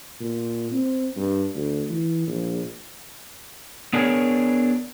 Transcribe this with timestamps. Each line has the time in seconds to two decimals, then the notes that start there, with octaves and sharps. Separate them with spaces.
0.20 A#2
0.72 C4
1.16 G2
1.56 D2
1.90 E3
2.27 A#1
3.93 B3 D4 G#4 A#4 B4 C#5